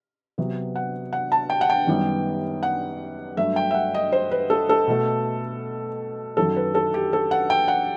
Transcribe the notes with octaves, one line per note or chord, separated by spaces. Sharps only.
C3 F#3 B3
F#5
F#5
A5
G5
F#5
G5
F#2 D#3 G3 B3
F#5
G2 F#3 A3 E5
G5
E5
F#5
D#5
C5
B4
A4
A4
B2 A3
F#2 D#3 F#3 A4
B4
A4
G4
A4
F#5
G5
F#5